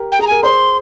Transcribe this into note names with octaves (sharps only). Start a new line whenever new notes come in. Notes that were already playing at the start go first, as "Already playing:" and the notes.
Already playing: G4 A#4
G5
G#4 A#5
A#4 G#5
G#4 C5 C6